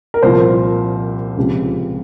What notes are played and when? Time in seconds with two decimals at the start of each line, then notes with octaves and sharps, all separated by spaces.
0.14 A#4
0.23 C2 A#2 F3 C5
1.37 C#2 C3 F3